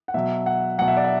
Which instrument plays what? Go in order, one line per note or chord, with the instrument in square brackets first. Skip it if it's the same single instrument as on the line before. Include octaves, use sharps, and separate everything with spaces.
[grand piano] F#5
B2 F#3 E5
F#5
B2 F#3 F#5
E5
D5
E5